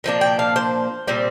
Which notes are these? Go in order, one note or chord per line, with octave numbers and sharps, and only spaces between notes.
A#2 F3 A#3 D4
G5
F5
C5
A#2 G3 C4